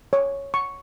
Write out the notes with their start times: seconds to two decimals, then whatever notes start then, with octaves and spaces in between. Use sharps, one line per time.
0.13 C#5
0.54 C#6